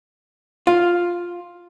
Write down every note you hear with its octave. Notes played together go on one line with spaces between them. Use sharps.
F4